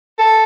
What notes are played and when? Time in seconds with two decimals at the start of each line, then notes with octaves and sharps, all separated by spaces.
0.19 A4